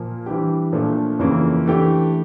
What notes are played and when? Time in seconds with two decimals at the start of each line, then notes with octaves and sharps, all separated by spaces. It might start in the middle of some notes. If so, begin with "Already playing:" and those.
Already playing: A#2 F3 A#3
0.26 E3 G3 D4 G4
0.72 A#2 F3 A3 D4
1.19 F2 C#3 E3 A#3 C#4
1.66 E3 A3 D4 G4